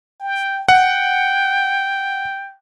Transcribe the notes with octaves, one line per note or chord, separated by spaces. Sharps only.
G5
F#5 G5